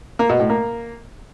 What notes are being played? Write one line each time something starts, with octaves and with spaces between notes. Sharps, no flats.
A#3
B2
A2
A#3